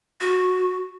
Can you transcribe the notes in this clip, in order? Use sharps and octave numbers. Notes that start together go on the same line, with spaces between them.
F#4